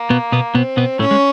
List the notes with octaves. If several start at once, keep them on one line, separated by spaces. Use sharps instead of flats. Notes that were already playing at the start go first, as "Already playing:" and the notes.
Already playing: A#3
B2 B3
B2 B3
B2 B3 C4
B2 B3
A2 A3 C#4
G#3